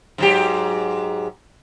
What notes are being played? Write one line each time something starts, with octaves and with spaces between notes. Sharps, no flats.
G#2 F#3 G4